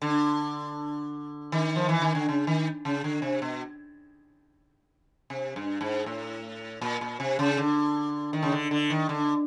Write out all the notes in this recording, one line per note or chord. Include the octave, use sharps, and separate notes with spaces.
D3
D#3
F3
E3
D#3
D3
C#3
D#3
C#3
D3
C3
B2
C3
G2
G#2
A2
A#2
A#2
C3
C#3
D3
D#3
C#3
D3
D3
D#3
D3